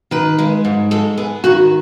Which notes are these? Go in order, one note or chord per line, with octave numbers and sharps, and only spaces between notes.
D#3 B4
G#3
G#2
G#3 A4
B3 G#4
D#3 F#4